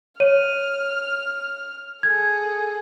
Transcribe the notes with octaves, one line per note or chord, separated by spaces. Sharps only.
C#5 F6 D#7
G#4 A4 G#6